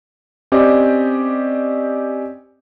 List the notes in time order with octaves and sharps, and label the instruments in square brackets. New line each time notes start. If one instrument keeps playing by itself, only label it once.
[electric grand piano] C4 C#4 G4 D5 D#5